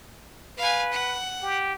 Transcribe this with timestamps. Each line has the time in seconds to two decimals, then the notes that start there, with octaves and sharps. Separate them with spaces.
0.58 B4 F5 G#5
0.92 F#5
1.43 G4